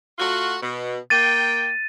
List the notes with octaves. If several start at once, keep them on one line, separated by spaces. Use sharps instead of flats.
A3 F4 F#4
B2
A#3 G5 A6 D#7